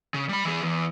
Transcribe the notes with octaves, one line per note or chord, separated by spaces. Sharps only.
C#3
G3 B5
E3 G#4
E2